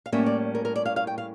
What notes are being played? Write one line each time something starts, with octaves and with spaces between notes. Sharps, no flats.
F5
A2 G3 A#3 C#4 E5
D5
A#4
A#4
D5
F5
F5
G5
F5